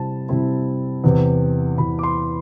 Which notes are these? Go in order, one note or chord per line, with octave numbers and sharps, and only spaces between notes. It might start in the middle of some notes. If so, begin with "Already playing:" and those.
Already playing: C3 G3 C4 E4 A5
C3 G3 C4 E4
E2 C3 E3
E2 C3 E3 B5
D6
C6